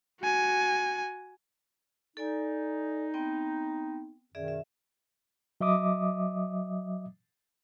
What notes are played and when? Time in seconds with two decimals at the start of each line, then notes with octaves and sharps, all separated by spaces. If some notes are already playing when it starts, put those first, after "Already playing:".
0.21 F#4 G#5
2.17 D#4 A4 D5 G#5
3.14 B3 C4 G5
4.35 F#2 B2 D#3 G#4 D5 E5
4.48 E5
5.61 F#3 D#5 E5 D6 D#6